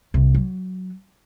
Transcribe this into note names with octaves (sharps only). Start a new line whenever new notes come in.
C2
F#3